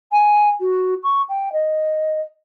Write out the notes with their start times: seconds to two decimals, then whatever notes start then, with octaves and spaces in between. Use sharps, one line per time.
0.12 G#5
0.60 F#4
1.03 C#6
1.29 G5
1.52 D#5